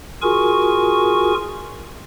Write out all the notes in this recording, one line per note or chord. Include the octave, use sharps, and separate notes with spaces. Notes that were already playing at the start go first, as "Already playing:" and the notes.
F4 F#4 G#4 A#4 G#5 C#6